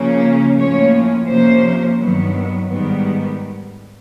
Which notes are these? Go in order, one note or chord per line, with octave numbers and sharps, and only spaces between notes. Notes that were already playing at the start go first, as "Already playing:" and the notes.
Already playing: C#3 F3 A#3 C#4
A2 F3 A#3 C#4 C#5
C3 F3 A#3 C#4 C5
G2 D#3 F#3 B3
G#2 D#3 G3 B3